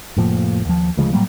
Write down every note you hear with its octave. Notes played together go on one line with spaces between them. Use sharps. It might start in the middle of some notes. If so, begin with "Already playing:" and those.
F1 A2 F3 A#3
D#2 F3
D2 C#3 F3 G#3
A2 F#3 G3 A#3